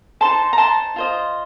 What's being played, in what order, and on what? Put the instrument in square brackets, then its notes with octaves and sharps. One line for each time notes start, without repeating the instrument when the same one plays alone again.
[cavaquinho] A4 C5 A5 C6
D#4
A#5
A5 C6
F4 C5 D#5